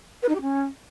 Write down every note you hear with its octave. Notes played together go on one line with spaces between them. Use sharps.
B4
D#4
G4
C#4